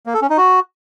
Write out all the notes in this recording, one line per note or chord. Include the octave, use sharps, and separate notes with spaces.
A#3
A4
C#4
D#4
F#4